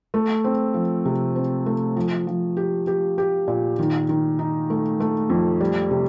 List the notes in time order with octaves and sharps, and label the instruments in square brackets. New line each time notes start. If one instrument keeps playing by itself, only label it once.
[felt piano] A3
C4
F3
C3
C4
A3
F3
F3
G4
G4
G4
A#2
D#3
D#3
D#4
A3
A3
F2
G3
C3